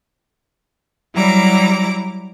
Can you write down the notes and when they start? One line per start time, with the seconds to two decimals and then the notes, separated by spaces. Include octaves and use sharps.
1.14 F#3 G3 E4 A#5 D6